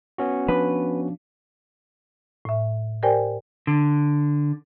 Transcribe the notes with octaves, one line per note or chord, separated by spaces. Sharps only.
B3 C#4 F#4
F3 D4 B4
A2 E5
G4 A#4 C5 D5 G5 G#5
D3